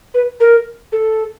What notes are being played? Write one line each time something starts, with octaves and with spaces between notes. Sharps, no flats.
B4
A#4
A4